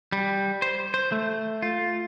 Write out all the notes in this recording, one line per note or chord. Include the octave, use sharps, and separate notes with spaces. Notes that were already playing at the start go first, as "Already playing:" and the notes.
G3
C5
C5
A3
F4